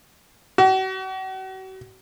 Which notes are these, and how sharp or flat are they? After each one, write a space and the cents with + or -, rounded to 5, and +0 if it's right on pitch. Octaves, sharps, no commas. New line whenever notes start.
F#4 +40